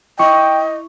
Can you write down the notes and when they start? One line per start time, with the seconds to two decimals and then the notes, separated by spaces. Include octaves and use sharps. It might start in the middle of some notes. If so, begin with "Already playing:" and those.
0.19 E4 D#5 G5 C#6 D6